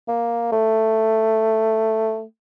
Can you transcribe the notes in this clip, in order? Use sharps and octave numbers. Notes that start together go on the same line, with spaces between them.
A#3
A3